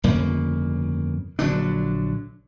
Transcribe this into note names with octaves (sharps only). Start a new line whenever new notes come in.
G1 F2 C#3 A#3
A#1 D3 F#3 D4